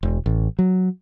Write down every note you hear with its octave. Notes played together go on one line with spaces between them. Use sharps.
E1
A1
F#3